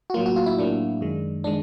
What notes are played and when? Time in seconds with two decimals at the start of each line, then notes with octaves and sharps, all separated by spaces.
0.10 F#4
0.14 A2 F#3 A#3 F4
0.26 F#4
0.36 F4
0.46 E4
0.58 A2 F#3 A#3 D4
1.01 F#2 D#3 G#3
1.44 D#3 G#3 D4